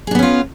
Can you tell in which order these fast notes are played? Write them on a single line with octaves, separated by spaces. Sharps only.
G#4 D4 B3 C#4 F4